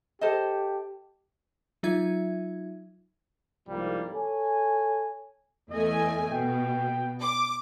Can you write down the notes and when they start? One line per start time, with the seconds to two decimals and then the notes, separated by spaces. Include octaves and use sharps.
0.21 G4 A4 C5 D#5
1.83 F#3 D#4 F4 E5 G#6
3.68 C2 G#2 F3 G3 A#3
4.13 A4 C#5 G#5
5.71 E2 A3 D#5 G#5
6.31 B2 G5
7.21 D6